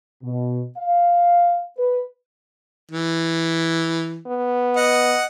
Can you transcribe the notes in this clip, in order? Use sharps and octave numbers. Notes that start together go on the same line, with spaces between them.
B2
F5
B4
E3
B3
D#5 F#5